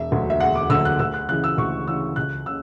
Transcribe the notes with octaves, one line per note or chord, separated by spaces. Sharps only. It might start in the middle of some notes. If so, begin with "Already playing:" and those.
Already playing: E1 E5
D2 D3 F#3
E5
E1 F#5
D6
D2 D3 F#3 E6
F#6
D2 E6
F#6
C#3 E3 F#6
E6
D2 C#6
C#3 E3 E6
C#2 F#6
C#3 E6